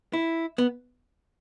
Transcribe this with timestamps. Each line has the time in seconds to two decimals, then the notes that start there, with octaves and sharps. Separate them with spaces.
0.13 E4
0.58 B3